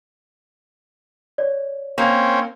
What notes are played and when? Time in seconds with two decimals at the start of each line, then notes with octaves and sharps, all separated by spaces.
1.38 C#5 D5
1.98 A#3 C4 C#4